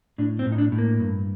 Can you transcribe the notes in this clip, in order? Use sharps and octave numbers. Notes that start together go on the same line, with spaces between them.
A2 D4
C4
A2
D#4
D4
A2
A#3
G2